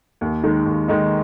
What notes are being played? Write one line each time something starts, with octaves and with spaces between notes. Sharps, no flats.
D#2
D#3 G#3 D#4
D#2
D#3 G#3 D#4